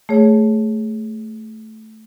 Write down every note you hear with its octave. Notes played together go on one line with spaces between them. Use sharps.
A3 G#4 C#5